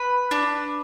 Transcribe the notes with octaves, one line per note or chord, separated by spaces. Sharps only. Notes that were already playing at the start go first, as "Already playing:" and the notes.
Already playing: B4
D4